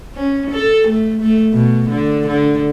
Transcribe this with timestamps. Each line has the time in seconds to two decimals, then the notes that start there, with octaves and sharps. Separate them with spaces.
0.15 C#4
0.51 A4
0.88 A3
1.22 A3
1.53 B2
1.90 D3
2.27 D3